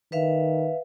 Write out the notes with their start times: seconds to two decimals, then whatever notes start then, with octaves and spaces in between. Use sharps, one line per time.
0.12 D#3 B4 E5 F5